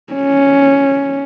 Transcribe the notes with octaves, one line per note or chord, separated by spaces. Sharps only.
C#4